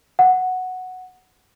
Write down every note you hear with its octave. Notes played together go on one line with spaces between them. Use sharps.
F#5